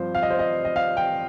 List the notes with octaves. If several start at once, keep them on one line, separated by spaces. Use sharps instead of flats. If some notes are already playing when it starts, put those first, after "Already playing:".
Already playing: G2 F3 C4 F4 C5
F5
D#5
C5
D#5
D#5
F5
G5